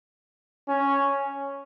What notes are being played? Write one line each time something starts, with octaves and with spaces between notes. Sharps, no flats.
C#4